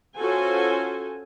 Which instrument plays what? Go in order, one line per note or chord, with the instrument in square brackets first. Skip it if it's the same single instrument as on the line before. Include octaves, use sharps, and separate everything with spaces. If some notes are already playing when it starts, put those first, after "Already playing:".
[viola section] C#4 F4 F#4 A4 C5 G#5